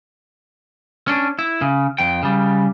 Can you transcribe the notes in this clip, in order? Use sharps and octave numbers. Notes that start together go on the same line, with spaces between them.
C#4 D4
E4
C#3
F2 G5
C#3 G3